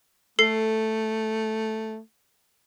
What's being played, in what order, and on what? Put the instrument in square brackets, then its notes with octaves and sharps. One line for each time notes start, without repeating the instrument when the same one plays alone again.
[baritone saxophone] A3 [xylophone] A4 C7